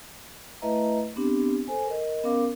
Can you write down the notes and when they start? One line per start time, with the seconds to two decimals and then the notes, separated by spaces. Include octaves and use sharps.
0.62 A3 E4 B4 D#5 E5 A#5
1.16 B3 C4 D4 G4
1.68 A4 C5 G#5
1.87 A#4 D#5
2.24 B3 C#4 A#4 F5 D6